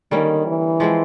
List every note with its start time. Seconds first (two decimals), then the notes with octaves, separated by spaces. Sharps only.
0.11 D3 D#3 G3 A#3 C#4
0.47 E3
0.80 F3 G#3 C4